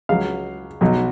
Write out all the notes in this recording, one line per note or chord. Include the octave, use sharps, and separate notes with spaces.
C#2 C#3 F#3 F5
B1 B2 F#3